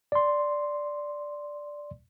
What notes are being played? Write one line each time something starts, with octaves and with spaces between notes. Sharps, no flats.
D5 C6